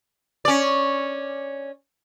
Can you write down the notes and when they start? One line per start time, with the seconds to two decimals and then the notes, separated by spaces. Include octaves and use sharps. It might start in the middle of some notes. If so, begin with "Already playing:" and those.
0.45 C#4 D5